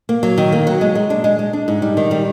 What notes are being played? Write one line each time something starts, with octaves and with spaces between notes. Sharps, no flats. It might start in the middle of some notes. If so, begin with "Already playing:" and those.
A#3
F#3
D#3
A#3
F#3
G#3
G#3
D4
G#3
G#3
D4
G#2
G3
D#3
G3